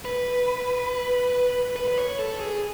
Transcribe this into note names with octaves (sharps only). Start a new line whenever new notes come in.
B4
B4
B4
C#5
A4
G#4